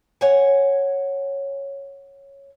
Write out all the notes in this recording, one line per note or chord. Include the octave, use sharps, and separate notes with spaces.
C#5 F#5 G#5